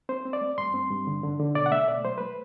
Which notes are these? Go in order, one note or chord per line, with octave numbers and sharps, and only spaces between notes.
C4 C5
C4
D5
A3
G2 C6
C4
G2
D3
D3
D3
B2 D5
F#5
A3 E5
B2 D5
F#3 C5
A3 B4